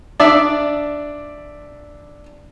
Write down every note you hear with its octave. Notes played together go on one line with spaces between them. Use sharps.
D4 D5 E5